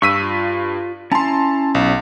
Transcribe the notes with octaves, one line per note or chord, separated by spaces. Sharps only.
G2 C#6 E6 B6 D#7
F4
C#4 E4 A5 A#5 C6
B1